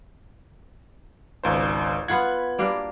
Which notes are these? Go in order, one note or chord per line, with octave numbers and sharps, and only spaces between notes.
G#1 C#2 C5
B3 F4 F#5 B5 G#6
G3 A#3 D4